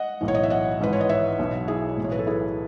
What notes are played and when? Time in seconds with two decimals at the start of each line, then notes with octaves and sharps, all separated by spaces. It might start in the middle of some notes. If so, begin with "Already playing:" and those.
Already playing: D#5 F#5
0.21 B1 A2 E3
0.28 C#5
0.35 D#5
0.43 E5
0.50 D#5 F#5
0.80 G#1 G#2 E3 B4
0.93 C#5
1.01 D#5
1.09 C#5 E5
1.39 B1 B2
1.68 E4 G#4
1.97 B1 A2 E3
2.04 C#5
2.12 B4
2.19 A4
2.27 E4 G#4